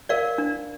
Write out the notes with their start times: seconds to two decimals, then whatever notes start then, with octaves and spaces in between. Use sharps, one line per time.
0.09 A#4 D5 F5
0.38 D4